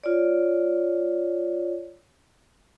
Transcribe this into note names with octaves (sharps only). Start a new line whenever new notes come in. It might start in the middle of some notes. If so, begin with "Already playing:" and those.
F4 C#5 D5